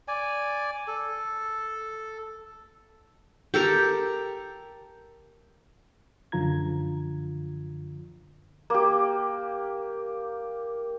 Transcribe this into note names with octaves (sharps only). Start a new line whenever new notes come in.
D5 G#5
A4
G4 A4 A#4
F#2 D3 F3 F4 A#5 G#6
A#3 G4